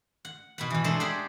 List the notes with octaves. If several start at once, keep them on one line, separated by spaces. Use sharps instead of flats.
F#5
B2 B4 F#5
B2 E3
G#3 D4 A4 C5
G4 G#4 C5 D5 F#5